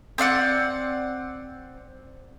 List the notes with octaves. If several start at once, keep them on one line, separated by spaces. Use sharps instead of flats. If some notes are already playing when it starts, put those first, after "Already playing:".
C4 D5 F5 F#5